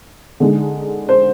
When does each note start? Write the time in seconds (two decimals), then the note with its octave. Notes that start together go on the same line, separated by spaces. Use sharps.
0.40 D3 G#3 D#4
1.09 C5